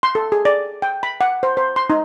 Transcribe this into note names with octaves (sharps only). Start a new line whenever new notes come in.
C6
A4
G#4
D5
G5
B5
F#5
C5
C5
C6
D#4